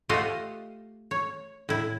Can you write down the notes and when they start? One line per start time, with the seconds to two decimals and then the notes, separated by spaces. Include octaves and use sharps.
0.09 A3 F4 G4 C5 D#5 F#5
1.11 C#5
1.69 A2 E4